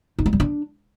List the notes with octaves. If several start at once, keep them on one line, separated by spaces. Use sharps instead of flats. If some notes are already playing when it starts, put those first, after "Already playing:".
D#4
G#3
G3
D4